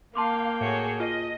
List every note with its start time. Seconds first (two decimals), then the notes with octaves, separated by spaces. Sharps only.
0.15 A#3 F5 G5 A5 C6 D6
0.61 A2 F#4 G#4 C#5
1.00 F4 D#5